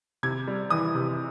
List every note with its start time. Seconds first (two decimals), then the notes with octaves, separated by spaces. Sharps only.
0.23 C3 G#6
0.47 G3
0.70 E3 D#6
0.95 C3